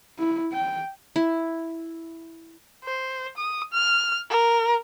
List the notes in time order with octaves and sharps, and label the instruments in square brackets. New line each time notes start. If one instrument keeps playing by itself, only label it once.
[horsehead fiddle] E4
G5
[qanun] E4
[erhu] C5
D#6
F6
A#4